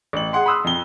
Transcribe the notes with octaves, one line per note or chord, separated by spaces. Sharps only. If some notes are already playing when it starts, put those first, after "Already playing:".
A1 F#7
G#4 F#5 C6
B5 C6 D#6 E6 F#6
F2 G7